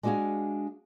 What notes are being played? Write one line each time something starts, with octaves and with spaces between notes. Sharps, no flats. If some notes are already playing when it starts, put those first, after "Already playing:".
G#3 D4 F4 F#4 G#4 F5